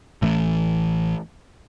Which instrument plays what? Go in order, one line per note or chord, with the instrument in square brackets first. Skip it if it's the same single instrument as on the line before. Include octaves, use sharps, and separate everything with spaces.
[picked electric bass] A1 E3 A3